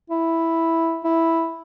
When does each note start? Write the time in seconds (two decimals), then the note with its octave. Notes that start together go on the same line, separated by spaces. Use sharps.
0.10 E4
1.04 E4